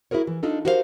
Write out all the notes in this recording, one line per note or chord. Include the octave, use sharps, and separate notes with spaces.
E4 F#4 G#4 A#4 C#5
E3
D4 D#4 F4 A4
F#4 G4 A#4 C5 C#5 F5